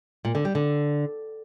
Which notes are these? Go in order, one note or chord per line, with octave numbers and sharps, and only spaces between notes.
A#2
D3
G3
D3